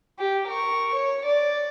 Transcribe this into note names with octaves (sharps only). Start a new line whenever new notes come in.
G4
A#4 C#6
C#5
D5